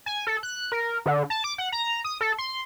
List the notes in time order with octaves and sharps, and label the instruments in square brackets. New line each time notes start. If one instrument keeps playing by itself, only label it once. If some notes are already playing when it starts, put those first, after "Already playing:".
[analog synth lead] G#5
A4
F#6
A#4
D3
A5
D6
F#5
A#5
D#6
A4
C6